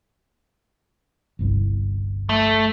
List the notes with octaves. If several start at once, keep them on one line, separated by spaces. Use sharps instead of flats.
G1 C2
A3